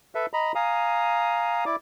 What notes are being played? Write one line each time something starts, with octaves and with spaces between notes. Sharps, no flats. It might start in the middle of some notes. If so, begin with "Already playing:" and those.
A4 B4 E5
D#5 A#5 B5
F5 G#5 A#5 D#6
E4 D5 D6